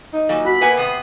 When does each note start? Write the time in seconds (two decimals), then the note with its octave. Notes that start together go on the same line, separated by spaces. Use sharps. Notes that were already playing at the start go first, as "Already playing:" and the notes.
0.13 D#4
0.29 A#2 F#3
0.45 F#4 B5
0.61 A#3 B3 B4 E5 G#5
0.77 C3 B3 D#6 C7